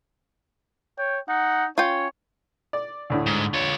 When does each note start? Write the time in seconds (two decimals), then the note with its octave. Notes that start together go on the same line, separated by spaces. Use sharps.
0.98 C#5 G5
1.28 D#4 F#5
1.78 C#4 F4 C#5 G5
2.73 D5
3.10 D2 A2 D3
3.26 G#2
3.54 F4 C#5